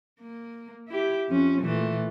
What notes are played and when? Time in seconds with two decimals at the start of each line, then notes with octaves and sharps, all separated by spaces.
0.21 A#3
0.88 E4 G4
1.29 F2 C#4
1.61 A#2 E3 A3